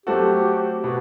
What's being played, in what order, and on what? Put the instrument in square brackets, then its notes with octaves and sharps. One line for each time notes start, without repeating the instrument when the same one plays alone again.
[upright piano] F#3 A3 C4 F#4 A4 [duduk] G4
[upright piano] B2 [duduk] F#4